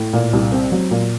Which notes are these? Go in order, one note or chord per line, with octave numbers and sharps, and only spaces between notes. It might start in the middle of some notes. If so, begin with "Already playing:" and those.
Already playing: A2
A#2
C2
C4
F#3
A#2